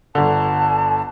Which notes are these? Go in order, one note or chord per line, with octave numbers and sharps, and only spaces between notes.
G1 D3 A5